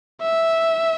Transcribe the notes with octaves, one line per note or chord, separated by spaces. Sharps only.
E5